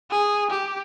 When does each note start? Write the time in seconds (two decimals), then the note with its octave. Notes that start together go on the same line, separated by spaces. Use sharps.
0.11 G#4
0.51 G4